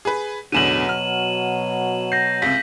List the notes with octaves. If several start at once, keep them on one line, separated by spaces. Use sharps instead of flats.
G#4 B4
A1 E2 B2 D3 F#3 D#7 E7 F#7
F6
G6 A#6 C7
C#2 C3 B6